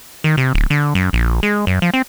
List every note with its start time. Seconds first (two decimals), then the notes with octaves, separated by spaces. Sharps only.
0.24 D#3
0.37 C3
0.55 D1
0.70 D3
0.95 F#2
1.13 A#1
1.43 G#3
1.67 F#2
1.82 F3
1.94 C4